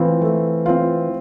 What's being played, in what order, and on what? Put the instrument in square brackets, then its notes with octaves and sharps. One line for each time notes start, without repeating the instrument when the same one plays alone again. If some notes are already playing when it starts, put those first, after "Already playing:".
Already playing: [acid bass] E3 [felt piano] A3 C4 F4
[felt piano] A3
C4 F4